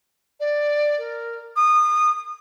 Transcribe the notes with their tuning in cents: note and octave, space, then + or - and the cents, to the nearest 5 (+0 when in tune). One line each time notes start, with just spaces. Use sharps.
D5 +10
A#4 -5
D#6 -25